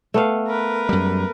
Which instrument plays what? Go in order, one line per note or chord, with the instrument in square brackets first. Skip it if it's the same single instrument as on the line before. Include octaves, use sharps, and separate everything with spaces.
[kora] A3 B3 F5
[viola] A#4 B4
[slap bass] F#2 G3